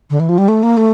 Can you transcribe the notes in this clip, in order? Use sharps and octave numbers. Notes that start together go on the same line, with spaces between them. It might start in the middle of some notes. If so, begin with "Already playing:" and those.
D3
E3
F3
G3
A3
A#3
A3